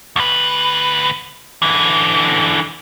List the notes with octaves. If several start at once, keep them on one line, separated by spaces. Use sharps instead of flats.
D2 B4
D3 E3